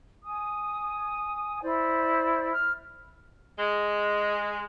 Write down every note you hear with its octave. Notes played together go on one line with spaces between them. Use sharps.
G#5 D#6
E4 C5 D5
F6
G#3